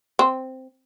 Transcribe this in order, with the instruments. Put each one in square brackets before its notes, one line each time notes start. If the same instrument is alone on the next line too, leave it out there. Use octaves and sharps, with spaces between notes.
[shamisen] C4